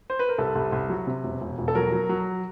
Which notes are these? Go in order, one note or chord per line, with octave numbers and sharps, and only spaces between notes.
C5
B4
A#4
C2 A4
C2
C2
F#3
C3
E1
E1
E1
A4
F#3 A#4
F#3
F#3